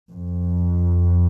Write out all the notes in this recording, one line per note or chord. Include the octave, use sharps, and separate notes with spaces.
F2